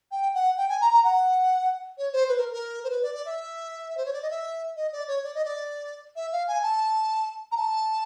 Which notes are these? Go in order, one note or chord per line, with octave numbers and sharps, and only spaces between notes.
G5
F#5
G5
G#5
A#5
A#5
F#5
C#5
C5
B4
A#4
A#4
C5
B4
D5
D5
E5
C5
C#5
D5
D#5
E5
D#5
D5
C#5
D5
D#5
D5
E5
F5
G#5
A5
A#5
A5